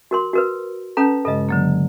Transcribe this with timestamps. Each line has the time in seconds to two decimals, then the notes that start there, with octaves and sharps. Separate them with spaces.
0.11 F#4 A#4 C6
0.33 F#4 A#4 B4
0.97 C#4 A4 B4 A5 A#5 G6
1.25 G2 C#3 G#3 A4 D#5
1.49 D3 F#3 A#3